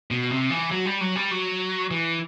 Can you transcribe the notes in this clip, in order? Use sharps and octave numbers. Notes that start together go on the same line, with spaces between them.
B2
C3
E3
F#3
G3
F#3
G3
F#3
E3